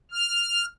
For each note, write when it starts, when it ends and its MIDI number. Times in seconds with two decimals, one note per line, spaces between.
0.11 0.66 89